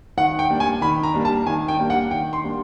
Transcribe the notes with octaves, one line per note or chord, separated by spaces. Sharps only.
D#3 F#5
G5
G3 A#3 D4
G#5
D#3 B5
A#5
G3 A#3 D4
A5
D#3 G#5
G5
G3 A#3 D4
F#5
D#3 G5
C6
G3 A#3 D4